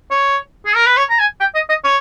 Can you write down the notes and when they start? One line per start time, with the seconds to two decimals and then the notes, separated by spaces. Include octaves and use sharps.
0.11 C#5
0.66 G#4
0.75 A#4
0.86 B4
0.97 C#5
1.10 A#5
1.19 G#5
1.40 G5
1.55 D#5
1.69 D#5
1.84 C#5